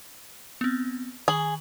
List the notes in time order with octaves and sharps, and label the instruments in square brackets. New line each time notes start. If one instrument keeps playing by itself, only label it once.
[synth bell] B3 C4
[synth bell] D#3 F#7 [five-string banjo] G#4